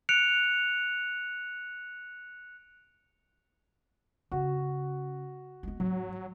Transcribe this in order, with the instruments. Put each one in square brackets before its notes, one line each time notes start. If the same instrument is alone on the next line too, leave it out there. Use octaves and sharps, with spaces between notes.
[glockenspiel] F#6 C#7 D7 F7
[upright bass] C#3 [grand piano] F#4
[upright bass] G#3 B3
[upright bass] G#2 [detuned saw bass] F#3